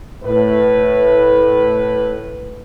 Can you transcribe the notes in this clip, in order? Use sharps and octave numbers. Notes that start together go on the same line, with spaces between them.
A2 B4